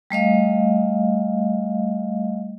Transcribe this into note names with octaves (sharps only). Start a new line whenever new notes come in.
G3 A3 D#5 F5